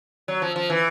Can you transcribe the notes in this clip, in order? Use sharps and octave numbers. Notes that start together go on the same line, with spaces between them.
F#3
F3
F3
E3